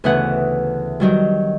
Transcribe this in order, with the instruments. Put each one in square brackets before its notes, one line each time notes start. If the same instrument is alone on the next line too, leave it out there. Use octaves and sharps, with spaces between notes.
[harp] D2 C#3 E3 B3 F#5
D#3 F#3 G3